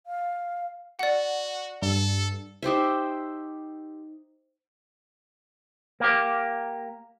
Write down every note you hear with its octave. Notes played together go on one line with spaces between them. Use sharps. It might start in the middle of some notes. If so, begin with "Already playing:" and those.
F5
F#4 D5 F#5
G2 A4
D#4 G4 C5 E5
A#3 G4